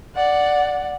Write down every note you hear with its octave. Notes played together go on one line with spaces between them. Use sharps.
D5 F#5